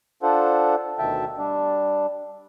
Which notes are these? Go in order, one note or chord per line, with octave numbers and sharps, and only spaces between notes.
D4 F4 A4 C5 F#5
D2 B2 D#3 E5 G5 A5
G3 D4